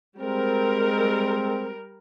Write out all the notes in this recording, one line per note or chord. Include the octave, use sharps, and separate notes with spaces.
G3 G#3 C4 A#4